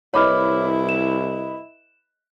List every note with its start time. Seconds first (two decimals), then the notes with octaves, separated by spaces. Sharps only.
0.14 C2 E4 B4 C#5 D#5 B5 D6 F6
0.89 E7